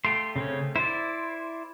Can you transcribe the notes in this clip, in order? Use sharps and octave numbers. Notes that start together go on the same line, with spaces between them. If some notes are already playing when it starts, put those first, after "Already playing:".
A3 F4 G4 C6
C#3 C4 C#4
E4 C5 D5